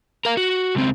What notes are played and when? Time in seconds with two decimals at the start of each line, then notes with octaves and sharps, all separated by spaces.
0.25 A#4 F5
0.37 F#4
0.75 C#2 C4